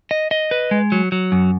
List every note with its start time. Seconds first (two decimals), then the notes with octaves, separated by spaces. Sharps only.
0.11 D#5
0.31 D#5
0.51 B4
0.71 G#3
0.92 F#3
1.12 F#3
1.32 F#2